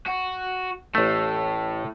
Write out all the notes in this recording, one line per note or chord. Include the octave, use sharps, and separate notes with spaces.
F#4
A1 A2 A3